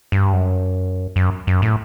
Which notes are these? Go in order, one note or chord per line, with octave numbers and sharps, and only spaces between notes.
G2
F#2
F#2
F#2
A2